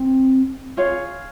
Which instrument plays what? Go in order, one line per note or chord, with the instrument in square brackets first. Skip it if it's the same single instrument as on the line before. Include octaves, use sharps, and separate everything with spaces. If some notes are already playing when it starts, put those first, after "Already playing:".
Already playing: [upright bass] C4
[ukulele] F4 G#4 C#5 F5